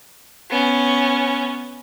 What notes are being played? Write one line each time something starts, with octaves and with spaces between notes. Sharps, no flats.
B3 C#4